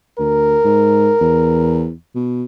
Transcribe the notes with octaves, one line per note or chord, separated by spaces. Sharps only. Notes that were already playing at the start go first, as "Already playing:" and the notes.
D2 A#4
G#2
E2
B2